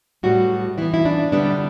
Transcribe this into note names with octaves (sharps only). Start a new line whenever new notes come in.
A2 G3 B3 F#4
E3 B3 E4
E4
D4
D3 G3 B3 D4